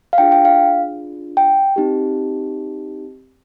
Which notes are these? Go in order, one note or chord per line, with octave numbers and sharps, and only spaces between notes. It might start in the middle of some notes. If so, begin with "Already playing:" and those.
F5
D4 F4 G#4 G5
G5
F5
G5
C4 D#4 G4